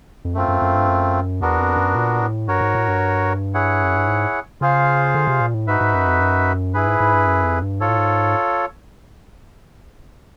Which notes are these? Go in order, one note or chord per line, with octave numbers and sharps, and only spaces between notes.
F2
F#2 A3 C4 F4
F#2
F#2
G2
F#2
E2 B3 D4 F#4 A#4
F2
F#2
A#2
A2
G2 F#4 A#4 C#5
G#2
A2
G2
E4 G#4 C#5 F#5
F#2
G2
G#2
C#3 F4 G#4 C5 F5
D3
C3
A#2
A2
G#2 D#4 F#4 B4 E5
G#2
F#2
F2
F#2
G2 E4 G#4 B4
G#2
G#2
G2
F#2
F2
G2
G#2 F4 A4 C#5
A2
G#2